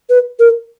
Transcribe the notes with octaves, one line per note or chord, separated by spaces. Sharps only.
B4
A#4